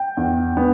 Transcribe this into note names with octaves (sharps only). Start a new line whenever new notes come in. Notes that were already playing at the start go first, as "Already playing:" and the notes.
Already playing: G5
E2
B3